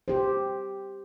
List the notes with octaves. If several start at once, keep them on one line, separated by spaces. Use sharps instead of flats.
G4 C5